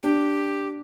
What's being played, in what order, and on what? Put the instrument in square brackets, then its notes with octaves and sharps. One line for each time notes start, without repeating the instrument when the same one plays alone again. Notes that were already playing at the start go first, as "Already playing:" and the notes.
[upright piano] D4 [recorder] G4